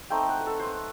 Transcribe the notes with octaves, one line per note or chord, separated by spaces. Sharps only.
A3 C4 D#4 G5
F#5
B4
A4
B4 C5